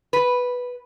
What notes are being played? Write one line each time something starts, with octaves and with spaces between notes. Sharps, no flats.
B4